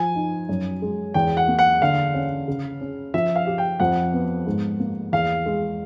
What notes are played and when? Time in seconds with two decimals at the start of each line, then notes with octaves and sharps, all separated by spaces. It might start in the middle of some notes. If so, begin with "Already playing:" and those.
Already playing: F3 G#5
0.15 D#4
0.49 F#2
0.82 G#3
1.14 E2 G5
1.37 F#5
1.48 A#3
1.59 F#5
1.82 D3 F5
2.14 C#4
2.48 C#3
2.81 C#4
3.14 F3 E5
3.36 F5
3.47 G4
3.58 G5
3.80 F2 F#5
4.13 B3
4.47 G#2
4.80 A#3
5.12 E2 F5
5.46 G#3